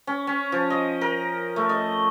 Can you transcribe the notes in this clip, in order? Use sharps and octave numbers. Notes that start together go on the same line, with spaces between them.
C#4
C#4
F3
D#5
A#4
A3
D#5